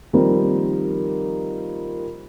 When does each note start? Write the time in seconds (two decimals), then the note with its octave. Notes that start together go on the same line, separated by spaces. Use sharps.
0.13 D#3 F3 G3 A#3 C4 D#4